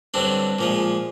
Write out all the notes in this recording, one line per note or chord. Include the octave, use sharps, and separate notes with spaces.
G2 D3 F#3 C4 D4
A#2 F3 G#3